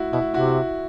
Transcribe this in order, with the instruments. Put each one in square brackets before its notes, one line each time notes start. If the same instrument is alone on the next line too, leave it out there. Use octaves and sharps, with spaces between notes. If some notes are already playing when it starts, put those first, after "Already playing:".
Already playing: [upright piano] E4 F#4
[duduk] B2 [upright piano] E4 F#4
[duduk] C3 [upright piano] E4 F#4